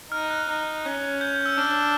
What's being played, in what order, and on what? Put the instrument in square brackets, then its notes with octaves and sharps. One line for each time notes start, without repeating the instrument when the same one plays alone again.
[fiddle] D#4 [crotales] F6
[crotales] F#6
[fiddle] D#4
C#4
[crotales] G6
G6
E6
[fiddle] D4 [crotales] F6